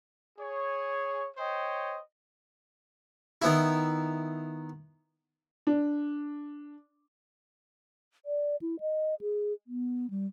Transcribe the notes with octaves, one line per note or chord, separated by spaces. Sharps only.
G#4 C#5
C5 C#5 D#5 G5
D#3 B3 E4
D4
D5
E4
D#5
G#4
B3
G3